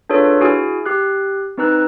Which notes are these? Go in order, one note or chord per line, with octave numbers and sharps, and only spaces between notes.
D4 F4 G#4 A4 B4 C#5
E4 F#4 G#4 G#5
G4 F#6
C4 D#4 B4 A#5 E6 F#6